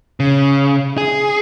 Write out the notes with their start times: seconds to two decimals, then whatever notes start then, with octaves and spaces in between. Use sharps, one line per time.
0.20 C#3
0.98 G#4